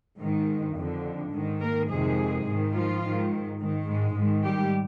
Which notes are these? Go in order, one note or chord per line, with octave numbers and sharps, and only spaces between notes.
G#2 D#3
F2 D3
G#2 D#3
A#3 A#4
F2 C3 D#3 G#3 G#4
G#2 D#3
F3 F4
G#2 D#3
G#2 D#3
G#2 G#3
G#2 D#3
G3 G4